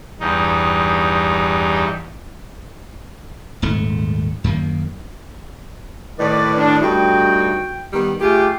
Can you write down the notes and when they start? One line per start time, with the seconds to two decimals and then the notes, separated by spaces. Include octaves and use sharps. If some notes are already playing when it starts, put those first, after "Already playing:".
0.20 E2 G2 D#4
3.62 D#1 G#2 A3
4.44 F#2 D#3 A#3
6.19 A2 D#3 B4 D5
6.57 D4
6.81 G2 A3 D#4 F#4 G5
7.93 D#3 G3 B3
8.20 A3 F4 G4 G#4